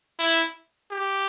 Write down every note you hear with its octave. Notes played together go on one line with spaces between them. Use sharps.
E4
G4